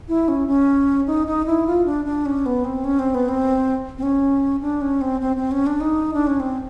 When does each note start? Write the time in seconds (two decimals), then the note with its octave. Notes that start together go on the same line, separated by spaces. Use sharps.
0.08 E4
0.28 C#4
0.48 C#4
1.07 D#4
1.27 D#4
1.46 E4
1.67 F4
1.86 D4
2.05 D4
2.26 C#4
2.46 B3
2.64 C4
2.84 C#4
2.99 C4
3.14 B3
3.28 C4
3.98 C4
4.03 C#4
4.62 D4
4.81 C#4
5.01 C4
5.21 C4
5.36 C4
5.51 C#4
5.66 D4
5.80 D#4
6.14 D4
6.27 C#4
6.40 C4